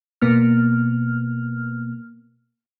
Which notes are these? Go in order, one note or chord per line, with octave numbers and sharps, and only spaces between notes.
B2 A#3 B3 F6